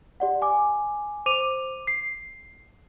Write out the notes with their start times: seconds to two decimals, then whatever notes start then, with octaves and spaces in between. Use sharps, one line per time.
0.20 G4 D5 F#5
0.42 G#5 D6
1.26 C5 D6 D#7 F7
1.87 C7